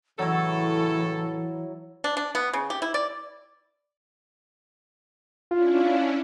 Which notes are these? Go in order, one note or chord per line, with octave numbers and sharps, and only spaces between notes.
A2 C#3 E3 F#3 E4 A4
D4
D4
B3
C#3
G4
E4
D5
C#4 D4 E4 F4